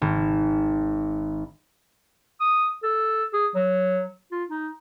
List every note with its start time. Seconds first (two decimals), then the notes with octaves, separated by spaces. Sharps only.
0.01 G#1
2.41 D#6
2.83 A4
3.33 G#4
3.55 F#3
4.32 F4
4.49 D#4